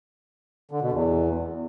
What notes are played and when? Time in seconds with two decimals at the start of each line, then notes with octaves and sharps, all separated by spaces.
0.71 D3
0.82 B2
0.92 E2